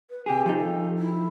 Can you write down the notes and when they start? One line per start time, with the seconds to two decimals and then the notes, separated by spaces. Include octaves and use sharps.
0.10 B4
0.26 C3 G4 G#4 G5
0.46 F3 D#4 G4
0.58 A4
0.98 E4